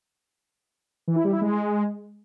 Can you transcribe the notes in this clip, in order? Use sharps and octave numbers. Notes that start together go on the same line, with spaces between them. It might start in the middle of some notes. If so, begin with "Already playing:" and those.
E3
E4
G3
E4
G#3